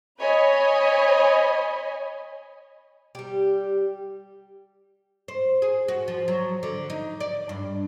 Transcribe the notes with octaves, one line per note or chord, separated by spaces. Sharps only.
C#5 D#5 G#5 B5
G3 G4
C5
G#4
F#4
F3
F#3
D3
D#4
D5
G2